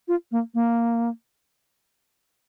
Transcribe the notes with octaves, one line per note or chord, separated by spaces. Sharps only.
F4
A#3
A#3